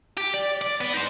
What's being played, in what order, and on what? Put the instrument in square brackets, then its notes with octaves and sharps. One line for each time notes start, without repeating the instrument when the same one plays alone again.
[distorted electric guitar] G4
D5
D5
B3
D#4 C5